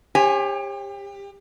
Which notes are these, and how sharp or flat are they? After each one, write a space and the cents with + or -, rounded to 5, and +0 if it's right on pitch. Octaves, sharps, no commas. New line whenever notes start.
G4 +30 C#5 -35 G#5 -5